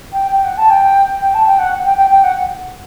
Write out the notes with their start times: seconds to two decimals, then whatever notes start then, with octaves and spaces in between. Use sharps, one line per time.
0.13 G5
0.31 G5
0.44 F#5
0.57 A5
0.70 G5
1.21 G5
1.34 A5
1.47 G5
1.59 F#5
1.85 G5
1.97 G5
2.10 G5
2.24 F#5